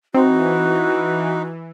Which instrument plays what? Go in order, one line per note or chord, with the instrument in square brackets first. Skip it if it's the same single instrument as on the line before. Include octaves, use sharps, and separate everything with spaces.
[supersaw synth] E3 [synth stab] C4 [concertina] D#4 [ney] F#4